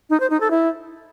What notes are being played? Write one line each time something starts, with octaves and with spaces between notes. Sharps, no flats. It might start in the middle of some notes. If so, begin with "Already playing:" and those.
D#4
C5
D#4
A4
E4